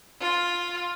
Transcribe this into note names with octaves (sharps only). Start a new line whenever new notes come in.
F4